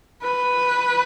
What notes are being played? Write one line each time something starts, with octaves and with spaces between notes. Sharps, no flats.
B4